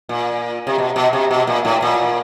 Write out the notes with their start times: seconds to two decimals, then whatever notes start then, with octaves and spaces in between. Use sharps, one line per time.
0.09 A#2
0.67 C3
0.78 B2
0.96 B2
1.13 C3
1.31 B2
1.47 A#2
1.65 A2
1.82 A#2